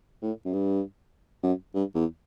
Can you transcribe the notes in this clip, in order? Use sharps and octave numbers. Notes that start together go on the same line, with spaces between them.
A2
F#2
G2
F#2
G2
E2